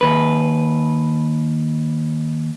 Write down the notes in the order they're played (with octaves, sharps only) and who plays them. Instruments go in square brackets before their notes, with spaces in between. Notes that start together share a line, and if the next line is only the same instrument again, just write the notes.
[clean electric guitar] D#2 B4